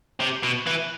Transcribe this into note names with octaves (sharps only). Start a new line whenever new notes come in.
C3
B2
E3